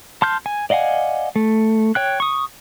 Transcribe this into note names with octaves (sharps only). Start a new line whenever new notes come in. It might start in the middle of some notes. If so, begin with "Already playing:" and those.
A5 C6 F6 G6
G#5
D5 D#5 F5 F#5 G#5
A3
C#5 G5 F#6
C#6 D#6